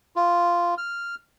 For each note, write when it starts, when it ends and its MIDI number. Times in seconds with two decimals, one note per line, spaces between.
0.16 0.75 65
0.78 1.15 89